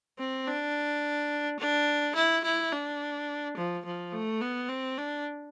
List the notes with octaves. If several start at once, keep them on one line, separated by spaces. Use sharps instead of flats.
C4
D4
D4
E4
E4
D4
F3
F3
A3
B3
C4
D4